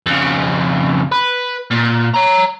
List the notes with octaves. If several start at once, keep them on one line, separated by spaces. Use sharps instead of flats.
F2 C#3
B4
A#2
C#5 A#5